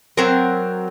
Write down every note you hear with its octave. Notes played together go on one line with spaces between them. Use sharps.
F#3 C4 A#4